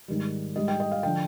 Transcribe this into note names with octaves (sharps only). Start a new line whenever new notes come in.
G#2 D#3 G3
G#2 G3 D#5
G5
D#5
F5
D3 F3 G5